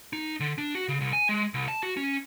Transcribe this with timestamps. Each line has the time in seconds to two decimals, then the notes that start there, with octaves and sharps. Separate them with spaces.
0.13 D#4
0.40 D3
0.58 D4
0.75 F#4
0.88 C#3
1.01 C2
1.13 G#5
1.29 G#3
1.54 C2
1.68 A5
1.83 F#4
1.97 C#4